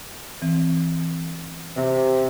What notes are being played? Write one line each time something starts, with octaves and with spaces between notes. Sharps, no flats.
E3 C4
C3